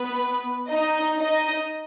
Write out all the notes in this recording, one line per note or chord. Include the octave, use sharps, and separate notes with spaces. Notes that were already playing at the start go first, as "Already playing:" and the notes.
Already playing: B3 B4
D#4 D#5
D#4 D#5